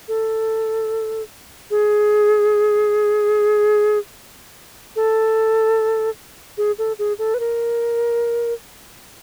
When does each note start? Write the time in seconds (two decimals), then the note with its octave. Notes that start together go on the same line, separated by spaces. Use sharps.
0.08 A4
1.71 G#4
4.96 A4
6.57 G#4
6.78 A4
6.99 G#4
7.19 A4
7.34 B4
7.40 A#4